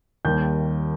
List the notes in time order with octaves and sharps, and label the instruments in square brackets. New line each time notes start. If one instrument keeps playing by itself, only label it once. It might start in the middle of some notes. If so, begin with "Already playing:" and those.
[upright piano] D#2 D#3 G3 A#3 G6